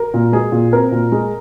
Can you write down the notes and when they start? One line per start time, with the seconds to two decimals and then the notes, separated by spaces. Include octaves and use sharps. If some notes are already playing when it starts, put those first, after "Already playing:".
Already playing: A#4
0.14 A#2
0.32 G#3 G#4
0.52 A#2
0.72 C4 A#4
0.91 A#2
1.12 G#3